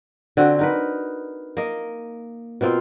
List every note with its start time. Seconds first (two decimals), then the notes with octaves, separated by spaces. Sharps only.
0.37 D3 C4 F#4
0.59 D#4 A#4 B4
1.57 A#3 D#5
2.61 B2 A#3 C4 F4